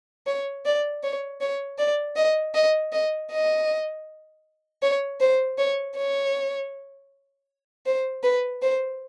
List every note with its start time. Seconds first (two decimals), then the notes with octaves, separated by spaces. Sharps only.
0.27 C#5
0.65 D5
1.03 C#5
1.41 C#5
1.78 D5
2.16 D#5
2.55 D#5
2.93 D#5
3.31 D#5
4.82 C#5
5.20 C5
5.58 C#5
5.97 C#5
7.86 C5
8.23 B4
8.62 C5